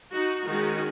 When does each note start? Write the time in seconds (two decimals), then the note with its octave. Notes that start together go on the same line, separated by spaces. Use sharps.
0.14 D#4 F#4
0.47 D#3 G#3 C#4 D#4 F#4